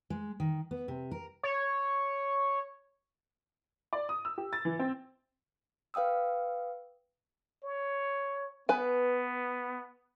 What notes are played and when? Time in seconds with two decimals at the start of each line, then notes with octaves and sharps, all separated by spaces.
0.10 G#3
0.40 D#3
0.71 B3
0.88 C3
1.11 A#4
1.43 C#5
3.93 D5
4.09 D#6
4.25 E6
4.38 G4
4.53 A6
4.65 E3
4.79 C4
5.94 B4 F5 G5 D#6 E6
7.64 C#5
8.69 B3 B4 G#5